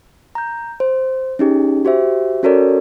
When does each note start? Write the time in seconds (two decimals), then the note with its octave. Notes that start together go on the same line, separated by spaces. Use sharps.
0.35 A#5 G6
0.80 C5
1.39 C#4 D#4 G4 G#4
1.85 F#4 G4 C5 E5
2.43 C#4 F#4 A4 A#4 C#5 D5